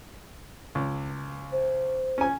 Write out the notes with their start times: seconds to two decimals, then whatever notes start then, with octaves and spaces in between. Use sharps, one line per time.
0.75 C#2
1.52 C5
2.18 C#4 G#5